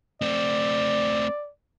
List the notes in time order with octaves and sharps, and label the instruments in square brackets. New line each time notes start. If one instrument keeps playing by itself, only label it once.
[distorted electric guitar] A3 C4 [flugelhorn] D5